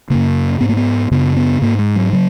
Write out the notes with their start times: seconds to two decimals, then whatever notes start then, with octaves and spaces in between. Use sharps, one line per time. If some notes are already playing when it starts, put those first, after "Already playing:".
0.10 F#2 C#3 A#3
0.61 G#2 B3
0.69 A#3
0.77 B3
1.11 F#2 C#3 B3
1.37 B3
1.62 G#2 A#3
1.79 G#3
1.96 F#3
2.13 C#3 F#3